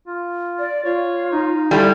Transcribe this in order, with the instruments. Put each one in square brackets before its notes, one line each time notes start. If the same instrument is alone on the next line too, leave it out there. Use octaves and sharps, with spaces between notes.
[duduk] F4
[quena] D5
[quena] F4 [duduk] C#5
[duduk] D#4
[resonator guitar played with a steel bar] G3 [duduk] E4 [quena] A4